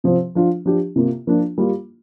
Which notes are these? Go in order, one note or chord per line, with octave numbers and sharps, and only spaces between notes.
C3 F3 C4
F3 D4 F4
F3 D4 G4
C3 A#3 F4
F3 A#3 D4 F4
G3 A#3 F4